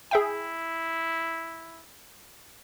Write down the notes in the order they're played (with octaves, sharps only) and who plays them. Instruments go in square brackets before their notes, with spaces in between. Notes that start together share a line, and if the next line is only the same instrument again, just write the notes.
[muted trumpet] E4 [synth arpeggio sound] G#4 E5 G5